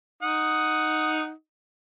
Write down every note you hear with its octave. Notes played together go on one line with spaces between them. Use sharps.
D#4 F#5 D#6